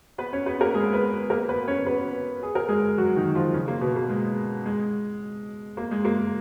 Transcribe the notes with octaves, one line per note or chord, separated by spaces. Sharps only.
B3 B4
C#4 C#5
B3 B4
A#3 A#4
G#3 G#4
B3 B4
A#3 A#4
B3 B4
C#4 C#5
B3 B4
G#4
A#4
G#3 G#4
F#3 F#4
D#3 D#4
F3 F4
C#3 C#4
A#3
B2 B3
A#3
G#3
G#3
A#3
G#3
A#3